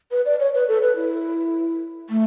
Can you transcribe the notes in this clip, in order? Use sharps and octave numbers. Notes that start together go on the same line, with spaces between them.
B4
D5
C#5
B4
A4
B4
E4
A3